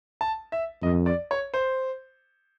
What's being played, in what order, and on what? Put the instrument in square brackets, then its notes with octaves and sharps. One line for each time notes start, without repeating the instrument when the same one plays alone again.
[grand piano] A5
E5
[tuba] F2 [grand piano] D#5
[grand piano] D5
C#5
C5